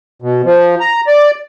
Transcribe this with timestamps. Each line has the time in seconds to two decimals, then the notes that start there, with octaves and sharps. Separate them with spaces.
0.22 B2
0.45 F3
0.80 A#5
1.07 D5